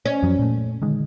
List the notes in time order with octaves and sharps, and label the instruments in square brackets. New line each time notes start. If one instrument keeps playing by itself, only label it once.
[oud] C#4
[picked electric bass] F#2 F3 F#3
A#2 A3
D3 D#3 G#3